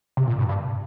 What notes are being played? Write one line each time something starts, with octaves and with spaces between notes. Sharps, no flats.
C3
A#2
G2
G2